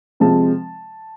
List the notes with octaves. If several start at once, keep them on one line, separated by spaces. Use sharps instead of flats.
C3 F3 G#3 C4 A5